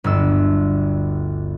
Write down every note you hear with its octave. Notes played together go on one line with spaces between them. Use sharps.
G1 D2 E6